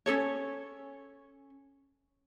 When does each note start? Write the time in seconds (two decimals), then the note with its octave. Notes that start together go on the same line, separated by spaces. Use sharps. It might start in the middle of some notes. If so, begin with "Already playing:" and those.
0.06 C#4 D4 A4 C#5